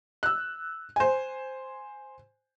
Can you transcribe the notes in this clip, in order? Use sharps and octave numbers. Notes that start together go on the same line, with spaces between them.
E6 F#6
C5 G#5